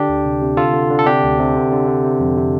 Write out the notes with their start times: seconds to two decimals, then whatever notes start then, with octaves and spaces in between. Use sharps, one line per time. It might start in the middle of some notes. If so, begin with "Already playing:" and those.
Already playing: D3 D4 G4
0.09 D2
0.25 C3
0.42 C3
0.57 D3 F4 A4
0.73 D3
0.91 D3
0.99 A4
1.06 C3 D4 G4
1.23 D2
1.39 C3
1.56 D3
1.72 D3
1.87 D3
2.04 C3
2.20 F2
2.37 C3